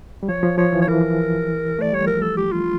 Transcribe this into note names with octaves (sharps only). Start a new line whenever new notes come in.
G3
F3 C#5
F3
F3 C#5
E3
C#5
E3 A#4
A3 D5
G3 C#5
F3 A#4
A4
G4
F4